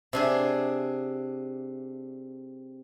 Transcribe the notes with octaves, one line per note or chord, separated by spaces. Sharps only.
C3 D4 G#4